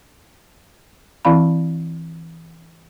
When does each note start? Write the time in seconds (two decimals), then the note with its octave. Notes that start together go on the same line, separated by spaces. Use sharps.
1.25 E3 C4 E4 F5 B5